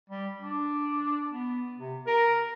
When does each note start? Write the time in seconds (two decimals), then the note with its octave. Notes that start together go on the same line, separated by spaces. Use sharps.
0.10 G3
0.41 D4
1.30 B3
1.78 C3
2.07 A#4